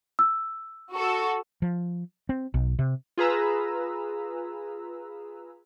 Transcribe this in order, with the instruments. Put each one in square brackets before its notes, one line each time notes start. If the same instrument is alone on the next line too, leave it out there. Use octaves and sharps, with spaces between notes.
[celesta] E6
[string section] F#4 A4
[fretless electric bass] F3
C4
B1
C3
[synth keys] F4 G#4 B4 A#5 E6